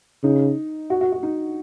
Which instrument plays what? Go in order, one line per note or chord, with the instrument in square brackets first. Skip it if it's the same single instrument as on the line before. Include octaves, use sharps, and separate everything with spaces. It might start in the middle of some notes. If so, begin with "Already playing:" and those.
[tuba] C#3 [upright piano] D#4
[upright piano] F#4
F#4
F#4
D#4